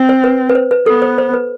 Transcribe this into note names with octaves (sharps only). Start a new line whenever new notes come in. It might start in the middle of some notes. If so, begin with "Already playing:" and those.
Already playing: C4
C5
B4
B4
C5
B4
B3 A4
C5
C5
B4